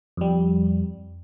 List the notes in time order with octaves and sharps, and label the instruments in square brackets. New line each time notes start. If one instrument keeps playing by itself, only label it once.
[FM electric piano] F2 G3